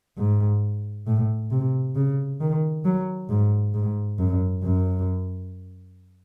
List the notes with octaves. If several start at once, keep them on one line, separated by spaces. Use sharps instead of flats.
G#2
A2
C3
C#3
D#3
F#3
G#2
G#2
F#2
F#2